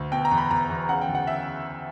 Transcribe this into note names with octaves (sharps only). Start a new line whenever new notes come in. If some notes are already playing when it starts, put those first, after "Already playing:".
Already playing: D2
B2 G5
A#5
E2
B5
E2 A#5
E2
C#3 F#5
G5
D2
F#5
C#3 E5